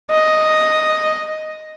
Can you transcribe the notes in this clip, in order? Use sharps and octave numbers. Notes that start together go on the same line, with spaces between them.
D#5